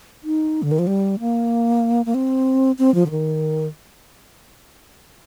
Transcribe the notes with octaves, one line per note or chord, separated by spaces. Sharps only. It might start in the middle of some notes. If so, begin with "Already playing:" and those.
D#4
D3
D#3
F3
G3
A#3
A#3
C4
C4
F3
D3
D#3